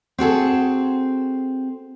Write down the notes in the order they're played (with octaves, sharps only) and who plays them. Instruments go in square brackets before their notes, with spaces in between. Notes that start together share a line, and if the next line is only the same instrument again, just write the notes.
[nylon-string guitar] C4 F#4 G#4 A4